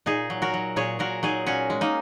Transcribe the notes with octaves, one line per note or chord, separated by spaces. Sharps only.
A#2 D#4 G#4
F#3
F#4 A#4
F#3
A#2 G#4 C#5
A#2 F#4 A#4
F#3 D#4 G#4
A#2 C#4 F#4
G#3
A#3 D#4